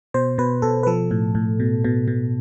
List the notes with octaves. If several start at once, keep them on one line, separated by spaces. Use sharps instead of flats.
B2 C5
B2 B4
B2 A4
B4
F3 A4
A2
A2
B2
B2
B2